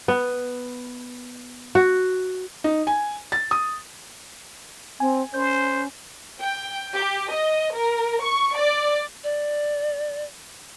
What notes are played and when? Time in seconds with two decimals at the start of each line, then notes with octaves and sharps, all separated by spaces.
0.08 B3
1.75 F#4
2.64 D#4
2.87 G#5
3.32 A6
3.51 D#6
5.00 C4 G#5
5.34 C#4 C5 G6
6.41 G5
6.94 G4
7.30 D#5
7.75 A#4
8.22 C#6
8.57 D5
9.24 D5